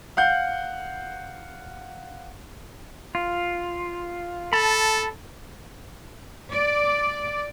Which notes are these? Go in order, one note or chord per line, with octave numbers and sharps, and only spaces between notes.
F5 F#5 G6
F4
A4 A5 B5
D5